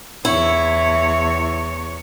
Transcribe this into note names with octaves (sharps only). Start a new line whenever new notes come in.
E2 E4 C#5